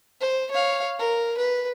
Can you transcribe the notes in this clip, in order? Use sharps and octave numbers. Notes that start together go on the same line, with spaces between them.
C5
C#5 F5
A#4
B4